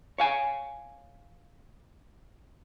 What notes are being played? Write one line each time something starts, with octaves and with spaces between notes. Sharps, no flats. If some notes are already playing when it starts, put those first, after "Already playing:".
C#5 F5 G#5